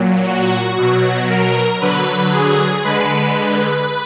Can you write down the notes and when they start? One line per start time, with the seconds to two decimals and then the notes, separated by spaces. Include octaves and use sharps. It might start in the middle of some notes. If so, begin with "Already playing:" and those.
Already playing: A#2 F#3
0.26 F#4
0.78 B2 F#3
1.30 A#4
1.81 D3 F#3 B4
2.32 G#4
2.84 D3 G#3 B4